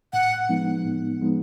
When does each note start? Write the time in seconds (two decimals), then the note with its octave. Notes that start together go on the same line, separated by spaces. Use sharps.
0.13 A2 F#5
0.49 F3 G#3 B3 D#4
0.85 A2
1.21 F3 G#3 B3 D#4